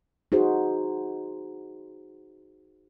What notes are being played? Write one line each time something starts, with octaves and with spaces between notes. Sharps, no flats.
D#4 F#4 G#4 C5